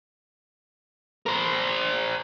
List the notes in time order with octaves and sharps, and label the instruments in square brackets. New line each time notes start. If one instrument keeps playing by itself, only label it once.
[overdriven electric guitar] A#4 C5